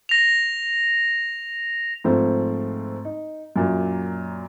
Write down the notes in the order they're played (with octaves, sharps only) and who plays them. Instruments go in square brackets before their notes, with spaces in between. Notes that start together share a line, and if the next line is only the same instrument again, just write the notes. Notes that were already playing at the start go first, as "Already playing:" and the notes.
[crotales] A#6 F7
[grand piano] G#2 F3 A3 C4
D#4
F#2 A#2